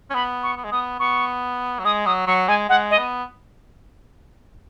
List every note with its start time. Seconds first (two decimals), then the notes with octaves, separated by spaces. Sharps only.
0.10 C#4
0.14 B3 B5
0.43 C#6
0.57 B3
0.64 G#3
0.71 B3 D#6
0.99 B3 C#6
1.79 F#3
1.84 G#3 D#6
2.06 F#3 D#6
2.27 F#3 C#6
2.48 G#3 G#5
2.69 G#3 F#5
2.91 D#5
2.98 B3